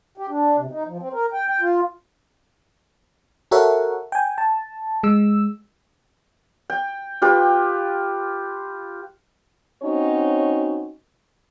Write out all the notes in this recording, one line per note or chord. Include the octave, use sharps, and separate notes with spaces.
G4
D4
C3
D#4
F3
C4
A#4
G5
G5
F4
F#4 A4 A#4 C#5 E5 F#5
G5 G#5
A5
G#3 E6
G5
F4 G4 B4
C4 C#4 D#4 F#4 C#5